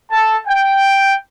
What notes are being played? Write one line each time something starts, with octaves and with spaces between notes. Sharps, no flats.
A4 A5
G5